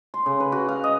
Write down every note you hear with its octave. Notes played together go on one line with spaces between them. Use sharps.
C6
C#3
B4
F#4
F5
D#5